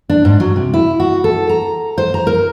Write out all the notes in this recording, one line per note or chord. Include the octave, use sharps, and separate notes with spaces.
D4
G#2
F#3
C3
E4
F#4
A4
A#5
C5
A#5
A#4